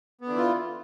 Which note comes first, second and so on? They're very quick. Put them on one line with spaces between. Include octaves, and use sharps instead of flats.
B3 D3 E3 E4 F4